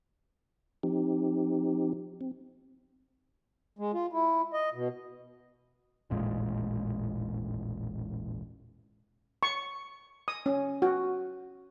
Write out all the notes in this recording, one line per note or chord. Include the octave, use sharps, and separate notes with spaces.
F3 C4 D#4 G4
C4
G#3
F4
E4
D#5
B2
E1 A1 A#2 G#3
C#6
D#6
C#4
F#4